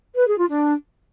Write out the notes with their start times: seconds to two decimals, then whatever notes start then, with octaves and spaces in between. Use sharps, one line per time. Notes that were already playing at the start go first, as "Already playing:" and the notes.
0.16 B4
0.27 G#4
0.37 F4
0.48 D4